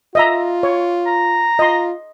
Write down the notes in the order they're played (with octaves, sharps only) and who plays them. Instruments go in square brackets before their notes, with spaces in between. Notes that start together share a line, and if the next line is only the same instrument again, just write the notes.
[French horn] F4 [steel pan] D#5 E5 A#5
[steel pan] C#5
[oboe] A#5
[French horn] F4 [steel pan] D#5 C6